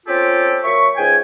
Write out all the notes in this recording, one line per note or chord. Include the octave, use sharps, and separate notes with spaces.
C4 C#4 F4 G4 A4
F#3 A#3 E5 C#6
C#2 G#2 G5 G#5